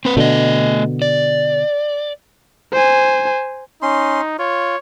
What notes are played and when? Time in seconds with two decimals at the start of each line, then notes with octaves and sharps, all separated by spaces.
0.05 C4 B4
0.17 B2 D3 A3 D#5
1.02 D5
2.73 C5 G#5
3.82 C#4 D#4 C6
4.39 F4 C#5